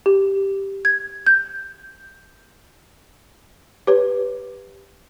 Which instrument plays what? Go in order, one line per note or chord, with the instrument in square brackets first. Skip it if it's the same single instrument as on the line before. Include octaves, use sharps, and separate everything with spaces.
[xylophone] G4
G#6
G6
[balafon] G4 B4 C#5